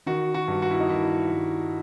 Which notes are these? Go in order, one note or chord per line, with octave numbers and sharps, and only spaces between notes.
D#3 F#4
F#4
G2
F#4
E4
D#4
D#3 E4
G2